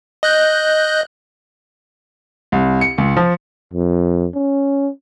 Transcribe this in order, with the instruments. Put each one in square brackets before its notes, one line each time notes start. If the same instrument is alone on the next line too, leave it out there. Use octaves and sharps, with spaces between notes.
[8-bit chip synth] D#5 F#6 G6
[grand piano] C2
C#7
C#2
F3
[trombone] F2
C#4